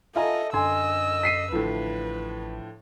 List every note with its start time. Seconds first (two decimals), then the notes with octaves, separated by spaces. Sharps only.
0.16 F4 A4 D#5 E5 G#5 A#5
0.53 F#2 D3 D#5 G#5 C6 E6
1.23 B6 C7 D#7
1.52 A1 A2 D3 F3 B4